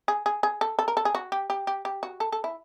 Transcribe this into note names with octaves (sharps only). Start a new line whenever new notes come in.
G#4
G#4
G#4
A4
A4
A#4
A4
G#4
F#4
G4
G4
G4
G4
F#4
A4
A4
E4